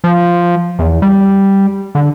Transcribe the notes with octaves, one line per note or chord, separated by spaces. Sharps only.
F3
E2
G3
D3